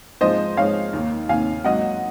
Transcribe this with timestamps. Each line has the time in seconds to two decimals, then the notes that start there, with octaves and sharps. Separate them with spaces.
0.21 G#2 F3 G#3 C5 D#5
0.57 G#2 F3 G#3 C#5 F5
0.93 D#2 D#3 A#3
1.29 D#2 D#3 A#3 F5 G#5
1.64 G#2 F#3 A#3 D#5 F#5